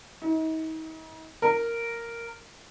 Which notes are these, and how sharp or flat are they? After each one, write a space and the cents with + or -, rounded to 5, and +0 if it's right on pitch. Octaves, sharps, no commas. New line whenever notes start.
D#4 +40
A#4 -5